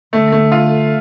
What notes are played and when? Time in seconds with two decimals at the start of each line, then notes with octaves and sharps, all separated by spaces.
0.13 D3 A3
0.32 A3
0.52 F4